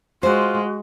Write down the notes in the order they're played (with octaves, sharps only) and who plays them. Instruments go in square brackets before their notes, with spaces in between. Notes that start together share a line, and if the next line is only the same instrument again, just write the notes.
[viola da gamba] G#3 [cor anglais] F4 [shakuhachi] F#4 [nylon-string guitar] C5